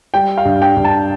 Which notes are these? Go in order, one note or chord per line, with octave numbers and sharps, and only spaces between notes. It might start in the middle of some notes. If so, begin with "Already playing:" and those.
G3 G5
F5
G2
G5
G2
A5